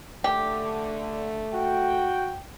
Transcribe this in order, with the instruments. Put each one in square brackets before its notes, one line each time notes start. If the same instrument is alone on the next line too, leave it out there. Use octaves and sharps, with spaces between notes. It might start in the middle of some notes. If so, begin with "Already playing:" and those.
[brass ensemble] D3 [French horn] A3 [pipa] G4
[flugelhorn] F#4 [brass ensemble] G5